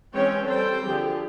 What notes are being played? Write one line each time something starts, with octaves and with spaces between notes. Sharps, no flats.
E3 G#3 C4 C#4 C#5 G5
G3 C4 A4 C5 G5
D3 F3 G4 G#4